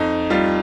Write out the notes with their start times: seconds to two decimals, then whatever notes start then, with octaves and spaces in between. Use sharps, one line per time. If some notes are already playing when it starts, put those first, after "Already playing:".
Already playing: F2 D#4
0.30 G3 F4